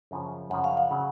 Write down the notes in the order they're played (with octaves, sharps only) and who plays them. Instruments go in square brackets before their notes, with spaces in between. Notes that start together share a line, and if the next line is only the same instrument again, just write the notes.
[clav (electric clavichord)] F#2 C#3 F3
[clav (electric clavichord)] F#2 C#3 F3 [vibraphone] F#5
[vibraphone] F5
F#5
[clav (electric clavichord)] C#3 F#3